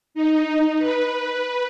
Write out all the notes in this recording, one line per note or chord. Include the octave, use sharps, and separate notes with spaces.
D#4
B4